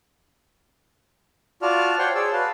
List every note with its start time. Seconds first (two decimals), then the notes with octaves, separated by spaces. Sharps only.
1.62 F4 F#4 D5 A5 F6
1.99 C5 C#5 F#5 G5 C6 C#6
2.15 G#4 C#5 D5 A5 E6
2.33 F#4 B4 F5 A5